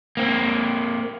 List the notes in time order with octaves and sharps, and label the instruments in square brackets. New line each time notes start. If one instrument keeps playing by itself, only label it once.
[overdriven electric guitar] A#3 C4